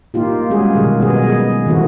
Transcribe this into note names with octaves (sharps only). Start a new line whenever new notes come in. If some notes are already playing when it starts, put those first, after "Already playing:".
A#3 D#4 F4 G4
G3 G#3 C#4 F#4 G#4
B2 D#3 F#3 G#4
B3 G#4
D#5
D#3 E3 A3 C4 F#4